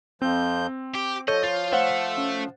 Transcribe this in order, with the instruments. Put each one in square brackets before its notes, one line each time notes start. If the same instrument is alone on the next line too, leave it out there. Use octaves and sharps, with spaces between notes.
[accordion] F2 F3 G6 [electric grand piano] C4
[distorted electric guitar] G4 [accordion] D6
[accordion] F3 [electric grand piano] A4 [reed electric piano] C#5 G6 [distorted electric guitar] D#5
[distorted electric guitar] F4 [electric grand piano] A6
[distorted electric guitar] A3 [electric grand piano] C5 F5 F#5
[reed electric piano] C#4